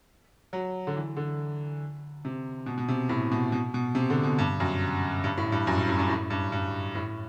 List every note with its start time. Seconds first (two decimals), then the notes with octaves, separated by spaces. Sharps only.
0.53 F#3
0.87 D3
0.96 E3
1.17 D3
2.25 C3
2.66 B2
2.78 B2
2.88 C3
3.09 A2
3.32 B2
3.52 B2
3.74 B2
3.95 C3
4.10 D3
4.23 B2
4.38 G2
4.60 F#2
5.24 G2
5.38 A2
5.52 G2
5.67 F#2
5.78 G2
5.87 A2
5.99 G2
6.09 A2
6.30 G2
6.52 G2
6.95 A2